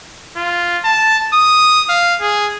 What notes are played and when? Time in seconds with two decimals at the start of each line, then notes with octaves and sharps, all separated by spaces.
0.36 F4
0.84 A5
1.34 D#6
1.89 F5
2.21 G#4